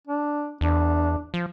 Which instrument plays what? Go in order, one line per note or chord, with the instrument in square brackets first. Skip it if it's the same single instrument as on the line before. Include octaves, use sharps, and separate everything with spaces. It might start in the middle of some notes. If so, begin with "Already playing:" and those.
[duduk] D4
[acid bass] E2 [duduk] D4
[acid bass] F3